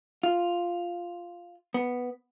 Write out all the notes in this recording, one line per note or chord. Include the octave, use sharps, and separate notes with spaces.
F4
B3